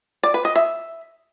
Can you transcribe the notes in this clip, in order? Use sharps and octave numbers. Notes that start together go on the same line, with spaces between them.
D5
B4
D#5
E5